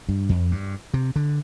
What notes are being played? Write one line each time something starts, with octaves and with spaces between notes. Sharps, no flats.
G2
F2
G2
C3
D3